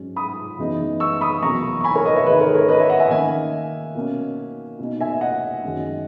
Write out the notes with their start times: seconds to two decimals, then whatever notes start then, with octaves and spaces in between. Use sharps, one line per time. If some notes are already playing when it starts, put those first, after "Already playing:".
Already playing: G#2 F#3 C#4
0.16 B5 D#6
0.58 F#2 E3 G#3 B3 D#4
1.00 C#6 E6
1.21 B5 D#6
1.42 E2 B2 F#3 A#3 A#5 C#6
1.81 C#6
1.84 G#5 B5
1.95 A#4 C#5
2.05 B4 D#5
2.16 C#5 E5
2.27 G#2 D#3 G#3 D#4 B4 D#5
2.41 A#4 C#5
2.55 A#4 C#5
2.68 B4 D#5
2.79 C#5 E5
2.90 D#5 F#5
3.00 E5 G#5
3.10 D#3 A#3 C#4 E5 G#5
3.95 B2 A#3 C#4
4.79 B2 A#3 D#4
5.01 E5 G#5
5.21 D#5 F#5
5.63 F#2 D#3 G#3 C#4